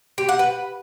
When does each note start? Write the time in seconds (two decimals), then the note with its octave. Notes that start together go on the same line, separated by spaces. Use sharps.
0.18 G4
0.29 F#5
0.39 B4